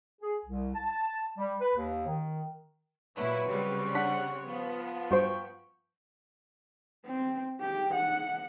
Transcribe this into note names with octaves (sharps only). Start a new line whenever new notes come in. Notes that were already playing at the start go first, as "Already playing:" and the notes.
G#4
C2
A5
G3
B4
D#2
D#3
A#2 F#3 E4 B4 C#5
C#3 G3 C4
D4 F#5 B6
F3 B3
G2 F#4 C5 G5 C#6
C4
G4
F#5